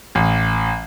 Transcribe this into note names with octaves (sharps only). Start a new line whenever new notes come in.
A1